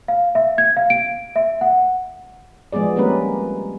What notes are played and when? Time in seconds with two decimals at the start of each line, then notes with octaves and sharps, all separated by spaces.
0.08 F5
0.35 E5
0.58 G#6
0.77 F5
0.90 D7
1.36 E5
1.61 F#5
2.73 F3 G#3 B3 G#4 D5
2.96 G3 A#3 C4 C#4 A#4 B4